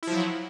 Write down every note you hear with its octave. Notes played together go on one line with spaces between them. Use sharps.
F3 F#3 E4